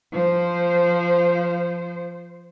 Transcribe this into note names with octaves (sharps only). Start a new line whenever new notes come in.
F3 C5